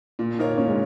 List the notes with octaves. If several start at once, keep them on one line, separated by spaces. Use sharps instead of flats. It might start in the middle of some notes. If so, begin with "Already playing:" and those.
A#2 F4
A#3 D#4 F4 A#4 C#5
A#2 C#4
G#3